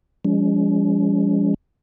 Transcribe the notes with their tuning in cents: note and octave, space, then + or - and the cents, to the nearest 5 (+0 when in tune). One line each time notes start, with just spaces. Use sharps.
F3 -5 G#3 -35 C#4 +40